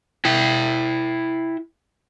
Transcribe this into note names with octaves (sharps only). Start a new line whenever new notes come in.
E4 G5